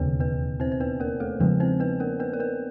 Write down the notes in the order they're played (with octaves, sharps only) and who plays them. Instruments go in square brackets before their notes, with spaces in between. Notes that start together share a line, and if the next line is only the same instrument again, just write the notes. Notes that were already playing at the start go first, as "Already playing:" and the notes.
Already playing: [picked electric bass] E1 D#2 C#3 [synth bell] B3 B4
[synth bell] B3 B4
C4 C5
C5
B3 B4
A#3 A#4
A3 A4
[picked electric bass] E2 C#3 F3 G#3 [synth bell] B3 B4
[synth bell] C4 C5
B3 B4
A#3 A#4
B3 B4
A#4
B3 B4